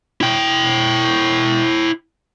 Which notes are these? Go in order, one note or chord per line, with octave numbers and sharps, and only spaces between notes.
E4 G5